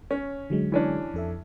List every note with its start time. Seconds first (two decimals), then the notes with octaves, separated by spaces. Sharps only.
0.11 C#4 C#5
0.50 D3 F#3 G#3
0.72 E3 C#4 D4
1.14 F2 A4 E5